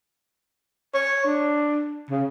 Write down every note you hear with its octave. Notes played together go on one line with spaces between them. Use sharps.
C#5
D4
C#3